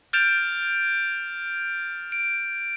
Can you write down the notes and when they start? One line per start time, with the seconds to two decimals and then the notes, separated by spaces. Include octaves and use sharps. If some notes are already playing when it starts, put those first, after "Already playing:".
0.13 F6 G6 A6 D7 E7 F7
2.12 D7